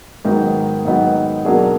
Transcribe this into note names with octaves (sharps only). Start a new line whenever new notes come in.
G#2 D#3 F#3 B3 D#4
G#2 D#3 F#3 B3 D#4
B2 F#3 A#3 D4 G#4